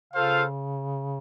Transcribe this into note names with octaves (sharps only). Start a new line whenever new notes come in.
C#3 F4 A4 C5 F5